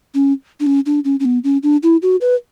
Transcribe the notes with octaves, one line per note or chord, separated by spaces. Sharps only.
C#4
D4
C#4
D4
C#4
C#4
B3
C#4
D4
E4
F#4
B4